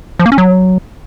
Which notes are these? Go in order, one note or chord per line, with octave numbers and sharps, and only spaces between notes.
F3
A#3
C#4
F#3